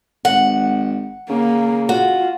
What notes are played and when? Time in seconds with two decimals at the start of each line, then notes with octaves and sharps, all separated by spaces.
0.25 G#1 F#5
1.30 C#3 A#3
1.89 F4 F#4